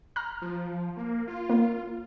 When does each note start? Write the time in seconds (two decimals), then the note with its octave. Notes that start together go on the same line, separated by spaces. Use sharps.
0.16 A#5 F6
0.42 F3
0.97 A#3
1.27 F4
1.50 A#3